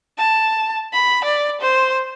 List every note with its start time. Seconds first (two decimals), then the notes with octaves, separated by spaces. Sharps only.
0.18 A5
0.93 B5
1.25 D5
1.62 C5